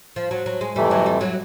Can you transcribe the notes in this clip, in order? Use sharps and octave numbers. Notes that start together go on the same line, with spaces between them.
F3
F#3
F#3
G#3
F2 C3 E3 G3 A3
F#3
G3
F#3